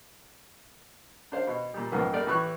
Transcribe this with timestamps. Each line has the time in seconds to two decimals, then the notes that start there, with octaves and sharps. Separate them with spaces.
1.32 D4 C5 F5
1.47 B2
1.74 A#2 G3
1.92 C#2 G#2 F3 A#3 B3
2.13 G3 A3 A#3 A#4 D5
2.27 A2 E3 G4 B5 C#6 F#6